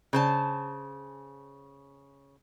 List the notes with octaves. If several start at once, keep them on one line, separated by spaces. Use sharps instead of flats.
C#3 C5 A5